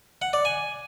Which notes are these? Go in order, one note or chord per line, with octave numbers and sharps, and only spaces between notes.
F#5
D5
G#5